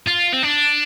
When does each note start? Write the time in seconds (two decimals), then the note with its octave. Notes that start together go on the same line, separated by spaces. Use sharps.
0.08 F4
0.33 C4
0.43 D4